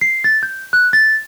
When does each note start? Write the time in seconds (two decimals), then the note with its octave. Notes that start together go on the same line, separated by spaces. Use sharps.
0.01 C7
0.24 A6
0.43 G6
0.73 F#6
0.93 A6